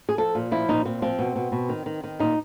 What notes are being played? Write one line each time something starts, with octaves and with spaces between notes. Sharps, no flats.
G#4
F3 A4
A#2
F3 E4
A#2 D#4
A#2 C4
F3 C4
B2
B2
B2
D#3
D#3
D#3
A#2 D#4